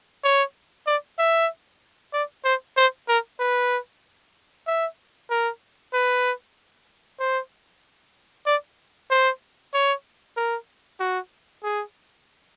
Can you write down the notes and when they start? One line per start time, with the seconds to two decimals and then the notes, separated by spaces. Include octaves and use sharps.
0.24 C#5
0.87 D5
1.19 E5
2.13 D5
2.45 C5
2.77 C5
3.08 A#4
3.40 B4
4.67 E5
5.30 A#4
5.94 B4
7.20 C5
8.46 D5
9.11 C5
9.74 C#5
10.37 A#4
11.00 F#4
11.63 G#4